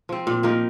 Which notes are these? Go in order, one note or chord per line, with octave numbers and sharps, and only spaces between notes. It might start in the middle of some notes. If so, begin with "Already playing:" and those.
F3 C4
A#2
F3 A#3 D#4